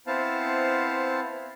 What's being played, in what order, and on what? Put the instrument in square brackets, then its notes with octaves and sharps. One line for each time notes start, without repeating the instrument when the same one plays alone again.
[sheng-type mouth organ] B3 C4 E4 C5 F5 A5